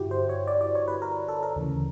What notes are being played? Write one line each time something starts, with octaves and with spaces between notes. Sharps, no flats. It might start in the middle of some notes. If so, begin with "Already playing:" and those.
Already playing: G2 D3 E4 F#4 G4
C5
C#5
D5
D5
C#5
B4
A#4
A4
A#4
D2 C#3 E3